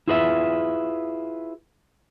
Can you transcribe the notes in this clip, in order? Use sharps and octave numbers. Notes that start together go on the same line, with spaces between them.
E4 F4 G#4 B4 C5 E5